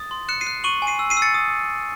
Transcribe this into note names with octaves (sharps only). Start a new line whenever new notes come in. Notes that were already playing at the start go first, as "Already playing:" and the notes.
Already playing: D#6 A6
C6
F#6 C#7 E7
C7 D#7
F#6
C#6 D#7 F#7
G#5
C7 D#7
E6
C7 D#7
E6
A6 C#7
D#6